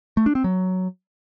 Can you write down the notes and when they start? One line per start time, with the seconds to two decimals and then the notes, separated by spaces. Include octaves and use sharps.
0.17 A3
0.26 D4
0.35 C4
0.44 F#3